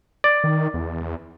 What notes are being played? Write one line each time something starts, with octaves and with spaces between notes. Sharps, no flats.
D5
D#3
E2